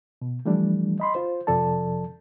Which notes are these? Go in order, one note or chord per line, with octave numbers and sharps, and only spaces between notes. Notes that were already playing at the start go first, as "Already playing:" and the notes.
B2
E3 F3 G3 A3 D4
D#5 B5 C6
F4 C5
F2 C3 F3 A4 D5 A5